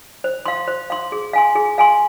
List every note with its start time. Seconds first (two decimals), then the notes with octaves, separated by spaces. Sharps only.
0.24 C5
0.46 F5 C6
0.68 C5
0.90 F5 C6
1.12 G#4
1.33 F5 G#5 C6
1.56 G#4
1.78 F5 G#5 C6